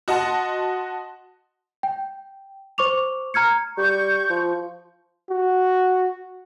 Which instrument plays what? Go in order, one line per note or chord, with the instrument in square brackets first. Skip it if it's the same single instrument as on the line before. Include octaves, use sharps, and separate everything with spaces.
[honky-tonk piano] F#4 D#5 F#5 A5 C6
[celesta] G5
C5 C#6 D6 F7
A#5 F6 G#6 C#7
[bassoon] G3 [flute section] C#6 G6
[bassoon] F3
[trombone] F#4